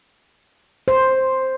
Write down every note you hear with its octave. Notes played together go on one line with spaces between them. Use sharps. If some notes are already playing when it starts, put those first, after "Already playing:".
C5